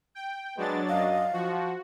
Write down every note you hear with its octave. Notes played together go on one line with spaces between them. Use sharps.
G5
F#3 G#3 B3 D4 A6
F#2 D#5 F5
F3 F#4